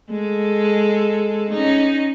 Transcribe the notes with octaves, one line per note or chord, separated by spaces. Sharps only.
G#3 A4
C#4 D#4